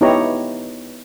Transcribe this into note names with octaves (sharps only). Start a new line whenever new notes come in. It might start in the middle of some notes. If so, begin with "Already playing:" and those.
B3 D#4 E4 G4 C#5 A#5